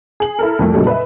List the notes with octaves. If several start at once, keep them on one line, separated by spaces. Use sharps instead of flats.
G#4 F#7
E4 A4 A#4
C2 F2 A3
A#2 C#3 F#3 G3 D#4 A4
B4 D#5 E5